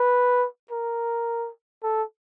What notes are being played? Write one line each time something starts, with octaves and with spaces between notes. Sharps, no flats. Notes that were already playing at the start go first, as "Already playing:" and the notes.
Already playing: B4
A#4
A4